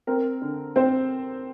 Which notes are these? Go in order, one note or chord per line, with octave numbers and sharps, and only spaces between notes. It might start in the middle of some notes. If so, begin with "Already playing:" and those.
C4 A#4
D3
C4 C5